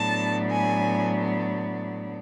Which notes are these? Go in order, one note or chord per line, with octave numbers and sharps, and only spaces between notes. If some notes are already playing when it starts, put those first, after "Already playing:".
Already playing: A2 F#3 B3 D4 A5
G#5